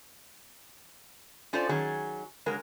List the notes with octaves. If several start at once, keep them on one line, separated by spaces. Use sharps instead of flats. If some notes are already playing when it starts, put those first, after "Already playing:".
C#4 F4 A4 C5 D5
D#3 F#3 C#4 G#4
C#3 F#3 G#3 A#4